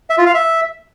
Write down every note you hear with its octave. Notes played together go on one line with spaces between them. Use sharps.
E5
F4
F5
E5